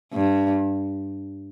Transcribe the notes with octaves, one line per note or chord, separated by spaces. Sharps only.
G2